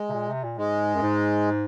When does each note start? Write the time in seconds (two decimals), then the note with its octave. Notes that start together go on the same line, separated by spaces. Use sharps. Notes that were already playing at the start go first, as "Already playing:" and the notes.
Already playing: G#3
0.09 C3
0.13 A#2
0.28 C3
0.43 A#2
0.57 G#2 G#3
0.95 F#2
1.02 G#2